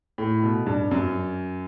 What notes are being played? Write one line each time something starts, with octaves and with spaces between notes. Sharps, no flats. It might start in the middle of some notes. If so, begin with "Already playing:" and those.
A2
B2
G2
F#2